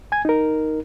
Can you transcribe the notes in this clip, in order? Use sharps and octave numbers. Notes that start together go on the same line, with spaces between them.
G#5 G#6
D#4 A#4